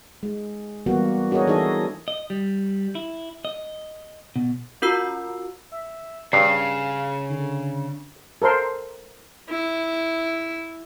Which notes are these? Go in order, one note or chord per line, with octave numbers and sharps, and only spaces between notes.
G#3
E3 G3 A#3 B3 F#4
D4 F#4 G#4 A#4 C#5 D#5
E3 D#4 E4 G#4 A4 D#5
D#5
G3
E4
D#5
B2
C#4 F4 F#4 A#4 E6 C7
E5
G2 C#3 F5 C7
D3
A4 A#4 C5 C6
E4